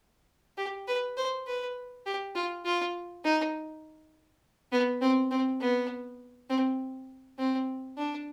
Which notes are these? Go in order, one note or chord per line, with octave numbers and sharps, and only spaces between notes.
G4
B4
C5
B4
G4
F4
F4
D#4
B3
C4
C4
B3
C4
C4
D4